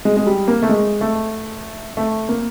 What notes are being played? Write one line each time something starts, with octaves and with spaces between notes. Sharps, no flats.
G#3
G#3
G3
A#3
A3
G#3
A3
A3
A#3